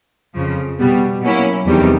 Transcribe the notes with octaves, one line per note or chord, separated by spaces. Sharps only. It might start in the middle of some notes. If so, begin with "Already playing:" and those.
F2 C#3 F3
B2 G3 B3
B2 F#3 A#3 C#4 E4
E2 C3 D#3 G3